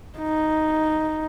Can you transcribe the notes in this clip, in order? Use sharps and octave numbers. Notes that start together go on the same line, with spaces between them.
D#4